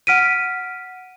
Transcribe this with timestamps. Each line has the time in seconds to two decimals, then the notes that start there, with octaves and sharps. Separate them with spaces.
0.07 F#5 F6 B6 D7 D#7